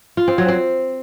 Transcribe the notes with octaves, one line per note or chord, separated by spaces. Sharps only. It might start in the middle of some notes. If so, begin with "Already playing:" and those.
F4
C4
F#3
C4